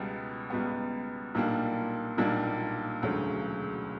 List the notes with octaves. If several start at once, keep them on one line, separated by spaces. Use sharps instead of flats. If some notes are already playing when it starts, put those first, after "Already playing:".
Already playing: C#2 B2 G3 B3
C#2 B2 G3 B3
B1 A#2 G3 A#3 D4
B1 A#2 G3 A#3 D4
E1 D2 C#3 F#3